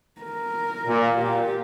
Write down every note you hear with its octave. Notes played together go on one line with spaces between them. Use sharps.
A#4
A#2
A#2 G4